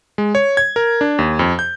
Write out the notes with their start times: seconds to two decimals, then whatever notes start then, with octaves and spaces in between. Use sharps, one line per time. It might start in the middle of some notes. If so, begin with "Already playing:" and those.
0.18 G#3
0.35 C#5
0.57 G#6
0.76 A#4
1.01 D4
1.19 D#2
1.39 F2
1.59 G6